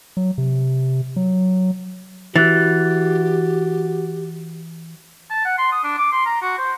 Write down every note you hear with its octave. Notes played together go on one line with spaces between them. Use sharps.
F#3
C3
F#3
E3 F#4 G4 F#6 A6
A5
F#5
C6
D#6
D4
D6
C6
A#5
F#4
C5